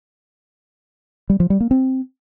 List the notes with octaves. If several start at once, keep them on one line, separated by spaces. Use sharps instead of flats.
G3
F3
G3
A#3
C4